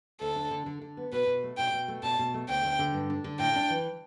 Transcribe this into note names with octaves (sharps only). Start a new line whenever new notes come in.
D2 A4
D4
D3
D3
D3
B3
B2 B4
B2
A3
B2 G5
B2
A3
B2 A5
B2
A3
D2 G5
D2
D3
G2
D4
D3
A2 G5
D4
E3